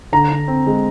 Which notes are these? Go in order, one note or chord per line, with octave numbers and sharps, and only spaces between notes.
D3 A#5
D3
C4
G#3